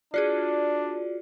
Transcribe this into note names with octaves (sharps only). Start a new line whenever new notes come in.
D4 F4 F#4 G#4 D5